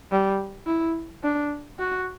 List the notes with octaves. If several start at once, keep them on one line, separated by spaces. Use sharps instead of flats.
G3
E4
D4
F#4